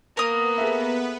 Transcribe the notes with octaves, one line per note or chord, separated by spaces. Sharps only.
A#3 B3 A#4 B4 D#6
G#4 A4 E5